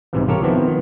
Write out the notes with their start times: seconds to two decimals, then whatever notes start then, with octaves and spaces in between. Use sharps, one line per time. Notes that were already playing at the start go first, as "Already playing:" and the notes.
0.13 C2 G#2 C3 E3
0.28 F4 G4 A4 A#4 C#5
0.42 D#3 F3 B3 C4 E4
0.67 D#3